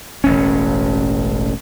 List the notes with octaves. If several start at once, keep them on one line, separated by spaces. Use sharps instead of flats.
E1 A1 C#4